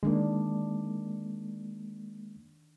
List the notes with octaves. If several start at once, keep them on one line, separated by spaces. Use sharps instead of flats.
D#3 G#3 A#3 D4